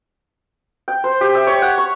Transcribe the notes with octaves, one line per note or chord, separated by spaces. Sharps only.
G5
C5
G4
E5
C#5
F#5
C#6